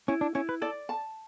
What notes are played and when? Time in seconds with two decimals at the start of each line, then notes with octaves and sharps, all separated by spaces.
0.08 C#4 E4
0.21 D4
0.35 C#4 E4
0.49 B4
0.62 A4 D5
0.89 A5